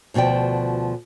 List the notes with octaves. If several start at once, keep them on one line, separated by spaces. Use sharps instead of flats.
D2 B2 F3 D5 G5